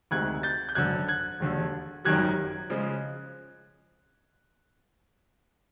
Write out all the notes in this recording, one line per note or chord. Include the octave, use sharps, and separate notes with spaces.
D2 C3 D#3 G#3 F#6 G#6
G6 A6
G6
G#1 F#2 D3 F#6 G#6
F#6 G#6
E1 D#2 D3
G#1 F#2 D#3 G3 F#6 G#6
C#3 F3 G#3